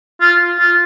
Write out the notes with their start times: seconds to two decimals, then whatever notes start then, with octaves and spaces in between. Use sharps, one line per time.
0.21 F4
0.59 F4